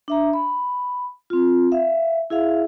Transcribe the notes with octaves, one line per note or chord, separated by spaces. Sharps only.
D4 E5 A#5
B5
C4 F4
E5 F5
E4 G#4 E5 F5